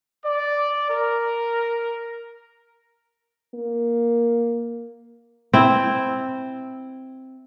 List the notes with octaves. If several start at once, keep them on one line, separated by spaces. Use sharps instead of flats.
D5
A#4
A#3
C4 E4